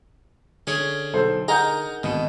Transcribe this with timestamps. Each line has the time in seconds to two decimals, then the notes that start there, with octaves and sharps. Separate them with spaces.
0.67 D3 C#4 G#4 C#5
1.13 B1 A4 C5
1.48 D#4 G#4 A#4 F#5 A#5 G6
2.03 G#1 B2 D3